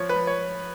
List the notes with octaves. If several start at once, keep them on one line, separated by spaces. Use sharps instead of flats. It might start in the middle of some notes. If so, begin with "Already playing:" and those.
Already playing: F3 C#5
B4
F3
C#5